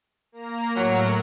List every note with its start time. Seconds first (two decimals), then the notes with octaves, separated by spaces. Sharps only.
0.32 A#3 A#5
0.76 A2 F#3 A#4 F#5